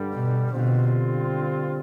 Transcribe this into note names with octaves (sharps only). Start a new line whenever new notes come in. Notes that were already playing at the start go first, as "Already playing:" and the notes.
Already playing: G2 D3 G3
B2
B2 D3 G3 C4 F4